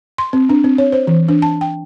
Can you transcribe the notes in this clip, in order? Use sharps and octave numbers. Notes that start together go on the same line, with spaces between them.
C6
C4
D4
C4
C#5
C5
E3
D4
A5
G5